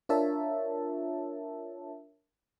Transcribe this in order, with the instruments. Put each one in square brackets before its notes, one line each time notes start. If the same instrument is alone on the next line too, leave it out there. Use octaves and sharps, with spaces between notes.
[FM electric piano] D4 F4 A#4 C#5 E5 A5